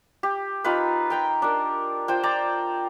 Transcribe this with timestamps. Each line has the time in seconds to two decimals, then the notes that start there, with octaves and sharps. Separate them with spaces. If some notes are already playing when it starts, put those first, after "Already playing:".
0.23 G4
0.64 D#4 F4 G4 B4
1.10 G5 A#5 C6
1.42 D4 A#4
2.08 F4 C5 G5
2.23 C5 D5 A#5